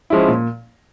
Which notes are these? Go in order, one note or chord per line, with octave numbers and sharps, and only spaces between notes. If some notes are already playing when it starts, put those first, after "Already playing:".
F3 G#3 C#4 E4
A#2